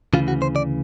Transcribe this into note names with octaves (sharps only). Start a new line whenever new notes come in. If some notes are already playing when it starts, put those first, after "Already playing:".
D2 C#3 E3 F4
F#4
C5
D5